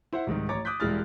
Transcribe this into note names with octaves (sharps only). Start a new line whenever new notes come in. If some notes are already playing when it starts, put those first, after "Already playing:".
E4 C5 E5 F#5
C2 G#2 D#3
A1 C#5 A#5 D6 A6
D6 D#6 F#6 G6 B6
E1 G3 G#3 E4 F6 A6